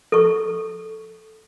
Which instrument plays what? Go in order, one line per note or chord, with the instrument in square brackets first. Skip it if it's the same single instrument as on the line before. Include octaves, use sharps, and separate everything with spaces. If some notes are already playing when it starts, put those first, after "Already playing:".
[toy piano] A4 C#6